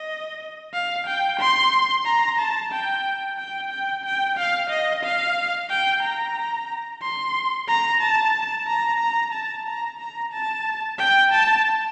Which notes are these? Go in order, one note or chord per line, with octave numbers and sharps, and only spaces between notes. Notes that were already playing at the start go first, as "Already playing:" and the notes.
Already playing: D#5
F5
G5
C6
A#5
A5
G5
G5
G5
G5
F5
D#5
F5
G5
A#5
C6
A#5
A5
A#5
A#5
A5
A#5
A#5
A5
G5
A5